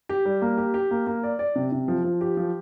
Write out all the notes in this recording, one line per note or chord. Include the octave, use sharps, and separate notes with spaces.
G4
G3
A#3
G4
G4
A#3
A#3
D5
D5
C3
C3
F3
F3
G4
F3